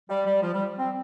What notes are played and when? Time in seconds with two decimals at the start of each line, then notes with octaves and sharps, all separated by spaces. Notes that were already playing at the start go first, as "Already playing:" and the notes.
0.10 G3
0.25 G3
0.42 F3
0.53 G3
0.78 C4